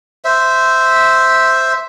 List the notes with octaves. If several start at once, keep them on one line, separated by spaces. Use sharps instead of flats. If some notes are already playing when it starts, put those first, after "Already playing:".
C5 E5